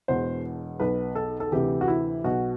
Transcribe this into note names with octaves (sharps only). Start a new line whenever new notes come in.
E1 E2 B2 C5
B1 B2 B4
A4
A4
D2 C3 E3 G4
F#4
E4
B1 B2 F#4